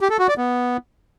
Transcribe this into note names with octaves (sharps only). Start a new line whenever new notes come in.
G4
A4
F#4
D5
B3